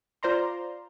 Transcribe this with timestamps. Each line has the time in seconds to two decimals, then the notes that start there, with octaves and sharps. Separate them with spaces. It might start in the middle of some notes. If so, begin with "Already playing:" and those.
0.23 F4 C5 D5 A#5 C6